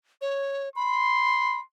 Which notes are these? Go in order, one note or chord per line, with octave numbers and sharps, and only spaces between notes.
C#5
B5 C6